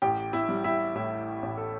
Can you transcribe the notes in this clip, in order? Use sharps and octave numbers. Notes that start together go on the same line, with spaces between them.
A1 G4 G5
E4 E5
G3
E4 E5
A2 E4 E5
A1
A4